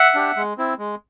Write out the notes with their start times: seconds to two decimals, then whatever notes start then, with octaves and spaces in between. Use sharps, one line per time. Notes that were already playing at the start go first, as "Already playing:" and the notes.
Already playing: E5 F#5
0.15 D4 G4
0.37 G#3
0.58 C4 E4
0.78 G#3